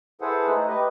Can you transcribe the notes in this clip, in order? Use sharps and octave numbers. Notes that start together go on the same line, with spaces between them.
E4 G#4 A4 B4 C5 F#5
A3 D#4
G4 B4 D#5